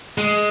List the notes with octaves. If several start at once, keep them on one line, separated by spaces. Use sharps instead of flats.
G#3